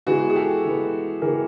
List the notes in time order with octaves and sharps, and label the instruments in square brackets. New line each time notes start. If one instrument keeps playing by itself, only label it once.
[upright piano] E3 G#3 B3 F#4 G#4
G#4
G4 A4
E3 G#3 B3
E3 G#3 B3 G#4 A#4